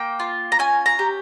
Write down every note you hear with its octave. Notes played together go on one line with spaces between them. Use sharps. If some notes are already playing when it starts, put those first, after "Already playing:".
Already playing: A#3 G5
F4
A#5
C#4 G#5
A#5
G4